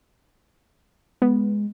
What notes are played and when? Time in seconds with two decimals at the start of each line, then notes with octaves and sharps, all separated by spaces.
1.22 G#3 B3